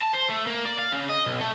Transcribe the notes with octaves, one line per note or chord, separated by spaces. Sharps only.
A5
C5
A3
A#3
D5
F5
C#3
D#5
B1
A3